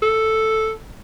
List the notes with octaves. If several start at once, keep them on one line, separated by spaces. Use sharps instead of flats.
A4